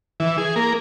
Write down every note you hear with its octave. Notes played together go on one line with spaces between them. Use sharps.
E3
G#4
A#3